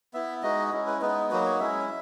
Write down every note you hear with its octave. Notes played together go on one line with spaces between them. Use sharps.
B3 E4 E5
G#3 D#4 F#4 D#5
G#3 C#4 E4
B4
G#3 B3 D#4 B4
F#3 A#3 D#4 F#4 B4
C#5
G#3 C#4 E4 E5